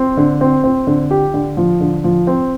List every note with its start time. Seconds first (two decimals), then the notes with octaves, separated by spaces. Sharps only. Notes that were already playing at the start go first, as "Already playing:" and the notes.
Already playing: C4
0.17 D3
0.41 C4
0.64 C4
0.87 D3
1.11 G4
1.34 D3
1.57 F3
1.80 D3
2.04 F3
2.27 C4